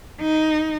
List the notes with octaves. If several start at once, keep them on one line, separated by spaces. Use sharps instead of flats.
D#4